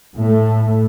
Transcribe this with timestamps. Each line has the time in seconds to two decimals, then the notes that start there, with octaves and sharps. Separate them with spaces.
0.15 A2 A3